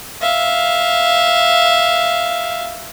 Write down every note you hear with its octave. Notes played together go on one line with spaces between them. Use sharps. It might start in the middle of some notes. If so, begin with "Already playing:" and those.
E5 F5